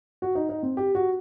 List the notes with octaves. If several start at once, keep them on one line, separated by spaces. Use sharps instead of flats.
F#4
D#4
D#4
C4
G4
F#4